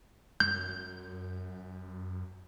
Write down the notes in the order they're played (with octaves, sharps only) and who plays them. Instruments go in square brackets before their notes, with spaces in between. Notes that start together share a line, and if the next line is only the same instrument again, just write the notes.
[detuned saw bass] F#2 [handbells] G6